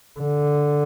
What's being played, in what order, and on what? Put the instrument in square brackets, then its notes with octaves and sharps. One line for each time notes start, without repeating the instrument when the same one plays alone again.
[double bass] D3